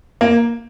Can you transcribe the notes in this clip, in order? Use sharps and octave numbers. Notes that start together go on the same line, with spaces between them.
A#3